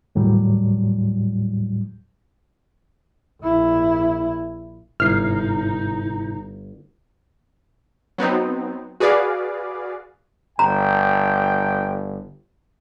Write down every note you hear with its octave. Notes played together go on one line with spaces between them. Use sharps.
D#2 A2 F#3 G3
A#1 E4
G1 G#2 C3 D#4 E4 F6 C7
F#3 B3 C4 D#4
F#4 G#4 B4 D5 F5
G1 G5 A#5